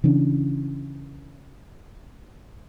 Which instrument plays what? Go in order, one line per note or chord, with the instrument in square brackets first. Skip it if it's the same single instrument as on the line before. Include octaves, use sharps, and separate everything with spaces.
[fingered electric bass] C#3 E3 C#4 D4